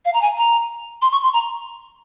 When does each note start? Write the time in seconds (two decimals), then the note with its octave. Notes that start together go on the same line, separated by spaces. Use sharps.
0.05 F5
0.13 A#5
0.21 G#5
0.37 A#5
1.02 C6
1.12 C#6
1.23 C6
1.33 A#5